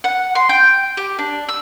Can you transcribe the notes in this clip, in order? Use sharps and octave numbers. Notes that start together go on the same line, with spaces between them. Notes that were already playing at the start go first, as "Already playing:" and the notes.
F#5
C6
G5
G4
D4
E6